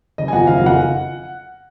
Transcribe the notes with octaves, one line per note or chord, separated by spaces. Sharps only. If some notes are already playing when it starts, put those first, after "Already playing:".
F#1 D#5
G#5
F2 F3 F#5
F#1 F5
F5
F2 F3 F#5